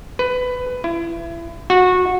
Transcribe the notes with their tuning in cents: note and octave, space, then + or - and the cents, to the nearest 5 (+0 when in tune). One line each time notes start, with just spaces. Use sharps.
B4 +15
E4 +35
F#4 -20